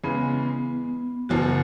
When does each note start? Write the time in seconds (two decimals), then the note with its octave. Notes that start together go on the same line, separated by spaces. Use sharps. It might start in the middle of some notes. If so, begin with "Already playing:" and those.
0.04 E2 C#3 E3 G#3 B3
1.29 F#1 E2 B2 F#4